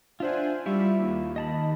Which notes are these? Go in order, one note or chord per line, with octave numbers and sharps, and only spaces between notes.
D4 F4 C5 E5 F#5 G#5
G3 E4 F4 E5 C#6
D#2
D#5 A5 B5